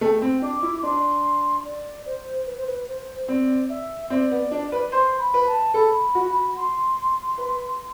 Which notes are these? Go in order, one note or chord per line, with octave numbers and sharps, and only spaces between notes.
A3 A5
G5
C4
D4 D6
E4
D4 C6
D5
C5
B4
C5
B4
C5
C4 D5
E5
C4 D5
B3
D4
B4
C5 C6
B5
B4
A5
A4 B5
F#4
C6
B4